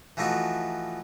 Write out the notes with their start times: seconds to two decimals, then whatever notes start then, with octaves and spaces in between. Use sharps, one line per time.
0.17 E3 F3 A3 D#4 F#4